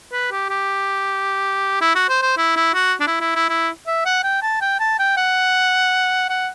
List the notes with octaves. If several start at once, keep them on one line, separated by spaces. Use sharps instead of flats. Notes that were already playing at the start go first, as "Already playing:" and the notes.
B4
G4
G4
E4
F#4
C5
C5
E4
E4
F#4
D4
E4
E4
E4
E4
E5
F#5
G5
A5
G5
A5
G5
F#5
F#5